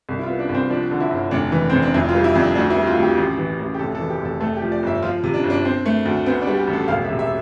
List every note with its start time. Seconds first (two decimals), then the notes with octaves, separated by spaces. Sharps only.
0.09 C2
0.19 E4
0.23 F4
0.28 B3
0.39 D4
0.49 C2
0.55 C4
0.70 F3 D4
0.91 D3
1.00 E4
1.11 G1
1.31 F1 D4
1.52 E3
1.70 F1 C4
1.83 D4
1.94 F2 E4
2.09 F4
2.15 G3
2.24 E4
2.35 F2 D4
2.55 D2 D4
2.70 E4
2.77 G3
2.87 F4
2.97 D2
3.03 G4
3.18 A1
3.38 E3
3.59 A1
3.74 G4
3.79 F1 A4
3.95 A4
4.00 E3
4.10 G4
4.20 F1
4.25 A4
4.41 A3 A4
4.57 G4
4.62 F3
4.72 D5
4.83 G1 E5
5.03 F3 F4
5.24 C3
5.34 D4
5.44 G1
5.50 D4
5.65 C4
5.86 A3
6.05 D2
6.26 B3 C4
6.42 D4
6.47 G3
6.57 G4
6.67 A1
6.73 A4
6.88 E1 F5
7.04 E5
7.09 C3
7.19 E5